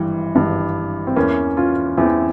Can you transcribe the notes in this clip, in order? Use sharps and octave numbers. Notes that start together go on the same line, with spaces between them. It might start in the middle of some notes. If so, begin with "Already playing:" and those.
Already playing: G#1 G2 E3 G3
G#1 G2 E3
C4
E2 E3 A#3 C#4
C#4 F4
E2 E3 C4 E4